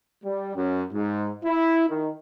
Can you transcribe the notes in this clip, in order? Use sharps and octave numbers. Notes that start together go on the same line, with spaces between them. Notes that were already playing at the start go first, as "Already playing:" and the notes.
G3
F#2
G#2
E4
D#3